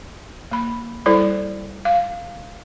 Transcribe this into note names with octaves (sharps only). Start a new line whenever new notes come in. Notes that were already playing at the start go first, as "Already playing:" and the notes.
A#3 B5
G3 E4 A4 C5 D5
F5